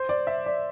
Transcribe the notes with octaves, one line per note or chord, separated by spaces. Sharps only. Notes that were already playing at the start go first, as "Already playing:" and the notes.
Already playing: C5
D5
E5
D5